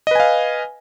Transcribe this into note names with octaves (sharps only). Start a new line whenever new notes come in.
B4 D#5 F5 G#5